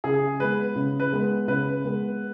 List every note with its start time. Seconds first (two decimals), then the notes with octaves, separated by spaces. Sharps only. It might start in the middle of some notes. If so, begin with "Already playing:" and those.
0.04 C#3 G#4
0.39 G#3 B3 B4
0.76 C#3
1.00 B4
1.13 G#3 B3
1.48 C#3 B4
1.85 G#3 B3